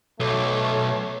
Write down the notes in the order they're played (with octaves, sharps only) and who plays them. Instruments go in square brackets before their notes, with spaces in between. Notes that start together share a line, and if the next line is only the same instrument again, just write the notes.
[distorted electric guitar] B1 [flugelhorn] A3 [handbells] A4 D6 [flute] C#5